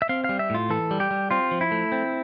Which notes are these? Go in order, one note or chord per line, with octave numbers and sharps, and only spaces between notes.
E5
C4 F5
G3 F5
E5
A2 F4
E3 A4
G3
G4
G3
C4 F4
F3
E4
A3
C4